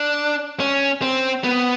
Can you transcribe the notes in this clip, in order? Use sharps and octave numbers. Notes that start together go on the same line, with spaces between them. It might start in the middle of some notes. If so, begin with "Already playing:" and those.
Already playing: D4
C#4
C4
B3